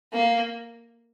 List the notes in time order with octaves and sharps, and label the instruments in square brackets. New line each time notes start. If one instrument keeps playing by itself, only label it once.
[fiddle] A#3